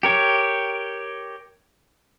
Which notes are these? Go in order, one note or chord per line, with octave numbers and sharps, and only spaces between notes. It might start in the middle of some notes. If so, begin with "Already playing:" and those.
G4 A#4 C#5